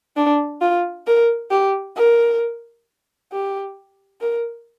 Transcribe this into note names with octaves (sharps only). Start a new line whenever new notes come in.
D4
F4
A#4
G4
A#4
G4
A#4